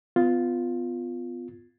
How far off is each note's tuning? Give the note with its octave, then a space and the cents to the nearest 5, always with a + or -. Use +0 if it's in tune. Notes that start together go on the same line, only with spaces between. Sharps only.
B3 +30 F4 +0